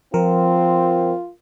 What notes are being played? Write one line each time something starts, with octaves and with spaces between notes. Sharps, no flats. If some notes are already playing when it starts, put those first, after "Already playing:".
F3 C4 F4 A#4